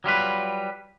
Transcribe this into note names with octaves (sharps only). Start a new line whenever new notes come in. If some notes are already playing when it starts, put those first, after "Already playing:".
F#3 G3 F4 B4